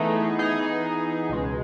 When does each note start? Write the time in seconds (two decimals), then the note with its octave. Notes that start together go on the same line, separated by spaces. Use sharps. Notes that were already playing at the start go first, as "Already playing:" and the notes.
Already playing: E3 A3 B3 D#4 G#4
0.39 E3 B3 D#4 G#4
1.29 C#2 B2 G#3